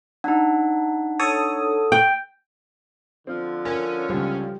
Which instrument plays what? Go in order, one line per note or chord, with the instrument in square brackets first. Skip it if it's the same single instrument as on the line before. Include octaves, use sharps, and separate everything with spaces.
[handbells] D4 D#4 [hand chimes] F#5
[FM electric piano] A4 C#5 D#6
[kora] G5
[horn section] D3 F3 [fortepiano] C4
[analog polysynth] C#4 [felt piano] A#4
[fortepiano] C#2 C#3 C5 [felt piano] G3